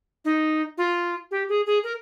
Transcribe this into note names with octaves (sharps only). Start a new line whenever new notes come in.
D#4
F4
G4
G#4
G#4
A#4